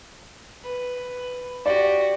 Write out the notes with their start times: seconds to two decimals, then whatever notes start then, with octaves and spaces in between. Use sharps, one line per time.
0.64 B4
1.66 F#4 G4 D5